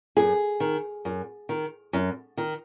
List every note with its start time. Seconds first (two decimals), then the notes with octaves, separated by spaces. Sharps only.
0.17 F#2 G#4
0.60 D#3
1.05 F#2
1.49 D#3
1.93 F#2
2.37 D#3